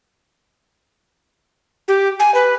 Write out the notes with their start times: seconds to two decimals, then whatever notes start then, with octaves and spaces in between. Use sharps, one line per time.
1.88 G4
2.20 G#5
2.34 B4